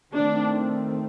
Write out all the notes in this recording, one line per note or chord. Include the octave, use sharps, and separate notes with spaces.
D#3 A3 C4 D4